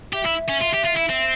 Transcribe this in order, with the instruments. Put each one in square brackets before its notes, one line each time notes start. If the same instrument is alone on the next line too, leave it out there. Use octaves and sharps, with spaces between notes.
[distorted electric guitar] G4 [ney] E5
[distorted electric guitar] E4
C#4
F4
G4
F4
E4
C4